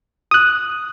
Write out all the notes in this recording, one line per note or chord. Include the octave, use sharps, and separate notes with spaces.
D#6 F#6